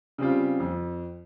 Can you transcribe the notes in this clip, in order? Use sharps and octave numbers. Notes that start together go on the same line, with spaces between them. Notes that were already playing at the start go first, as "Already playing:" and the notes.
C#3 G3 C4 F4
F2